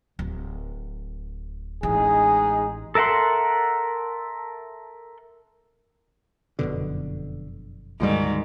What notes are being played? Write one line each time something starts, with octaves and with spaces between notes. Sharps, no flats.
D1
A1 G#3 D#4 G#4
A4 A#4 E5 F#5 C6
F#1 F2 B2 D3
D2 G#2 D#3 G3